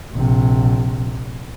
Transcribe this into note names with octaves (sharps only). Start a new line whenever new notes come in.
A#1 C3